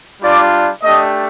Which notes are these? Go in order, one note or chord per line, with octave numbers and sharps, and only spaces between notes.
G3 D4 F4 D5
A3 D4 G4 D#5